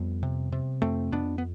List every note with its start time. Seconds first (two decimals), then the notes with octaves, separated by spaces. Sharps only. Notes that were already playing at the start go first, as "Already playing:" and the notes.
Already playing: F2 G3 B3
0.23 C3
0.52 C3
0.82 F2 A3 C4
1.12 F2 B3 D4
1.38 B3